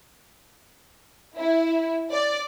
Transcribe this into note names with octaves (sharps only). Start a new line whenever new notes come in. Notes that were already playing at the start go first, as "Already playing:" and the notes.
E4
D5